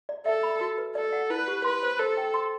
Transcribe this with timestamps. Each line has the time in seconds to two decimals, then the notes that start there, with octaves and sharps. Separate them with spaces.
0.09 D5
0.26 A4 E5
0.43 B5
0.61 F#4
0.78 B4
0.95 A4 D5
1.13 F#5
1.30 E4 B4
1.48 G4
1.64 B4 C6
1.83 C5
1.99 A4 C5
2.17 G5
2.34 C6